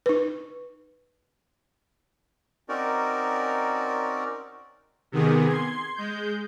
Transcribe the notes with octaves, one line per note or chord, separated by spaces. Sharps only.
D#4 B4
C4 C#4 D#4 F#4 A#4 D5
C3 D#3 B3 G#4
C6 G#6
G#3 G6